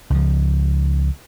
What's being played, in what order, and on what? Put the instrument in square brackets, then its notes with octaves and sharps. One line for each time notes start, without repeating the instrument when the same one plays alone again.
[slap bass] C#2 F3